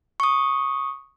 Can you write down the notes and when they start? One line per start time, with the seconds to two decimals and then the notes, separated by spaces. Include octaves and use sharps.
0.20 C#6 D#6